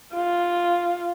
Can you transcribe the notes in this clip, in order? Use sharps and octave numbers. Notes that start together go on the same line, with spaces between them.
F4